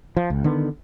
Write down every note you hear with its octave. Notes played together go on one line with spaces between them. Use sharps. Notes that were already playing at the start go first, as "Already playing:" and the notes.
F3
C#2
D3 D#3 B3